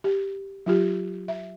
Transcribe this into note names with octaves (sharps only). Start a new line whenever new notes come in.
G4
F#3 F4 G4
E5